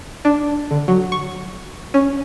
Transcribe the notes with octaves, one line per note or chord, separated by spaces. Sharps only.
D4
D3
F#3
C#6
C#4